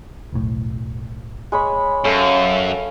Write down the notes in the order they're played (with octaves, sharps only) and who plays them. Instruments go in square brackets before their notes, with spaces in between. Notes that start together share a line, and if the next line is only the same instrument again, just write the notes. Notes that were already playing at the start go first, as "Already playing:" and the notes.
[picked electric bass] E1 B1 A2
[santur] G#3 C#5 B5
[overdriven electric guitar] F#2 [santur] C#4 A4 F5